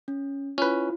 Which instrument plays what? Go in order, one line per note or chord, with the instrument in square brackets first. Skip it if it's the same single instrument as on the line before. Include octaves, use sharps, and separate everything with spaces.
[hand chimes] C#4
[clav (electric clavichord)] C#4 B4 [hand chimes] E4 F4